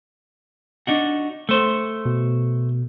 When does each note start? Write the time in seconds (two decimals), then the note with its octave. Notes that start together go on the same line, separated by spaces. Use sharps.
0.87 D4 D#4 F#4
1.49 A3 C5
2.06 B2